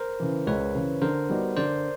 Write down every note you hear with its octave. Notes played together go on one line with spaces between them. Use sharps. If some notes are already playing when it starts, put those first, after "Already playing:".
Already playing: A#4 C5
C#3 E3
C#2 B4 C#5
C#3 E3
D3 A#4 C5
G3 B3 D#4 F#4
D3 C5 D5